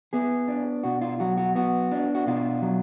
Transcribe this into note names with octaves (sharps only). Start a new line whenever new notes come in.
B3 G#4
D4
B2 F#4
F4
F#3 F#4
F#4
B3 F#4
D4
F#4
B2 F4
F#3